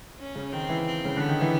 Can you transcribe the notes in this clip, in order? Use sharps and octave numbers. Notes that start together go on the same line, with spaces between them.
C#4
C#3
D#3 C4
E3
C4
C#3
D3 B3
D#3
E3